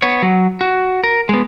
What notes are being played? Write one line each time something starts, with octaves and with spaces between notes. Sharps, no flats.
B3 C#5
F#3
F#4
A#4
G#3 B3